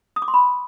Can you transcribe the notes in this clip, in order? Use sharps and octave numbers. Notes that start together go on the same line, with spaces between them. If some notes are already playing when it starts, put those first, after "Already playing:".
D#6
D6
C6
B5